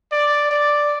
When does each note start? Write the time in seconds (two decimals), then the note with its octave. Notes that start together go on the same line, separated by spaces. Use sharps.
0.12 D5
0.51 D5